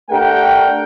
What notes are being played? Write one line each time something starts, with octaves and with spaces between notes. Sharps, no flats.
A3 D4 G4 A#4 F#5 G5